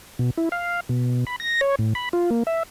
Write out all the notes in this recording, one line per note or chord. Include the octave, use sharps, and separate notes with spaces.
B2
E4
F5
B2
B5
A#6
C#5
A2
B5
F4
A#3
E5